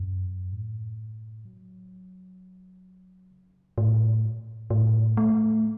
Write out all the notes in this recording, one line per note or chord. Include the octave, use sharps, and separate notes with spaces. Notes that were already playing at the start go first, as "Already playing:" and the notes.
Already playing: F#2
A2
F#3
C#3
A2
A2
A3